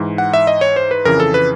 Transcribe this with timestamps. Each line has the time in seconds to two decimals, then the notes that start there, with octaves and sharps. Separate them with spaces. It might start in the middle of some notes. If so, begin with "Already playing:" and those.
Already playing: G#2 E3
0.18 F#5
0.34 E5
0.47 D#5
0.61 C#5
0.76 C5
0.91 B4
1.05 F2 C#3 E3 A#4
1.20 A4
1.34 B4